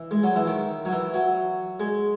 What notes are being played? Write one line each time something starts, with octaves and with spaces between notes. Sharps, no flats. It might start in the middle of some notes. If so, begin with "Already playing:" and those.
Already playing: E3
G#3
F#3
E3
D#3
F#3
E3
F#3
G#3